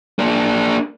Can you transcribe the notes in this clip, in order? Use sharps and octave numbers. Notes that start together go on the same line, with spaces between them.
A#3 D4